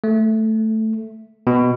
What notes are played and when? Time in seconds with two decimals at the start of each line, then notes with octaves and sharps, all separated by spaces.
0.04 A3
1.47 B2